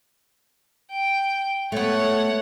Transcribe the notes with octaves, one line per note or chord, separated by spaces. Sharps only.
G5
A3 B3 C#5 F#5